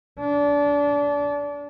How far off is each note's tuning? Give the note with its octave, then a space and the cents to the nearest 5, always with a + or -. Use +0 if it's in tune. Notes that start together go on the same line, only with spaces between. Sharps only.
D4 -25